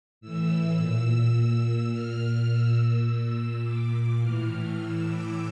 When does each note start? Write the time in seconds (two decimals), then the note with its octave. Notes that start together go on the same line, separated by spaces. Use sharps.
0.21 A2 E3 E6
0.77 A#2
1.07 E6
1.34 A#2 E6
1.91 A#2 F6
2.49 A#2 E6
3.06 A#2 E6
3.63 A#2 D6
3.92 D6
4.20 A2 E3 F6
4.77 A2 E3 E6
5.06 D6